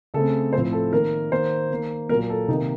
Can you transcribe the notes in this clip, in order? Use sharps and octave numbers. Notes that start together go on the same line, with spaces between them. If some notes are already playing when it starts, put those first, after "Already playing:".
C#3 A3 C4 A4
A2 F3 C4 C5
A4
D#3 A#3 A#4
D#3 A#3 C5
D#3 A#3
A#2 F#3 A#3 A#4
A4
C3 D#3 A#3 D#4